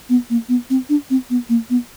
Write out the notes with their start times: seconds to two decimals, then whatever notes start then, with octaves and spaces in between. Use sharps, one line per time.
0.09 B3
0.30 A#3
0.49 B3
0.70 C4
0.89 D4
1.10 C4
1.30 B3
1.49 A#3
1.70 B3